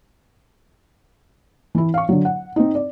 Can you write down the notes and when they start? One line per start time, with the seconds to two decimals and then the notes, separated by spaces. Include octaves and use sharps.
1.75 E3 E4
1.94 F5 C#6
2.09 D3 F#3
2.25 F#5
2.56 C4 D#4
2.75 D5